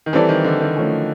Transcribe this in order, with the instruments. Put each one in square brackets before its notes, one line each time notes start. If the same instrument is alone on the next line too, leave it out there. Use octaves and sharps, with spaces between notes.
[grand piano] D#3
[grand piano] E3 [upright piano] G3 C4 E4 A4 D5
[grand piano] D#3
D3
D#3
[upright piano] F3 A3 C#4